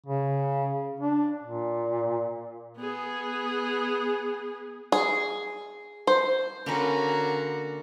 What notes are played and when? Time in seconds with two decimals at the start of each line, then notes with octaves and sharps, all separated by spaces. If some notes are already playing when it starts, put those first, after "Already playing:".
0.06 C#3
1.01 D4
1.44 A#2
2.78 B3 G#4
4.92 G#4
6.07 C5
6.66 D3 A#3 C#4 F#4 B4 A#5